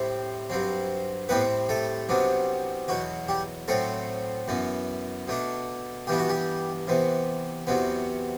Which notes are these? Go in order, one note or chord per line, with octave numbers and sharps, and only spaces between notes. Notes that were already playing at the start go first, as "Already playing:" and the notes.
Already playing: A2 G3 C4 E4
G2 F#3 C4
A2 G3 B3 C4 E4 B4
A3 A4
C2 C3 F#3 B3 D4
E2 B2 F#3 F#4
G3 G4
A2 F#3 A3 C4 A4
F#2 E3 B3
B2 A3 D4
G2 E3 B3 D4 G4
F#4
G3 G4
C3 E3 B3
E2 C3 F#3 B3